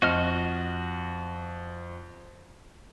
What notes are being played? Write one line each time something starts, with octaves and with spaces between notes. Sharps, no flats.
F2 F#4 D#5 F6